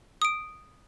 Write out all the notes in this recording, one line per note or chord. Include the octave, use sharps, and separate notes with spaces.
D#6 D7